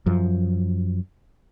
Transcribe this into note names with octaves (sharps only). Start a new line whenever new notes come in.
F#2 F3